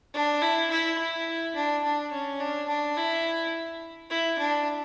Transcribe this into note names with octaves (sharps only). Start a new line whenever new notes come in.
D4
E4
E4
E4
D4
D4
C#4
D4
D4
E4
E4
D4